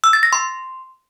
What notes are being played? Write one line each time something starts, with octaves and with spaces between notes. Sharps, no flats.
E6
A6
A#6
C6